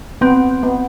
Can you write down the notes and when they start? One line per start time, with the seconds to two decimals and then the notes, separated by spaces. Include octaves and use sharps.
0.21 B3 C4
0.63 B3